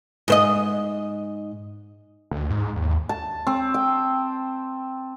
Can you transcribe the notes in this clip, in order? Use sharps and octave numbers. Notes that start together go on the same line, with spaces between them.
G#2 C5 D#5
D2
G#2
D#2
A5
C4
G5